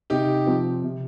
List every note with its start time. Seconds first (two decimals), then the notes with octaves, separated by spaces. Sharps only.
0.10 C3 D#4 G4
0.47 F3 C4
0.84 C3